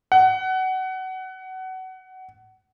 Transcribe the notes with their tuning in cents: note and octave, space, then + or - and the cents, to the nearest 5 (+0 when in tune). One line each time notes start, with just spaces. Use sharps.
F#5 +20